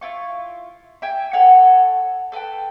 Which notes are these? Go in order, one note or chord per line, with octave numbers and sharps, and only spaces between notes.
E4 F4 C#6
E5 G5 G#5
A4 C#5 F#5
A4 B4 F5 G5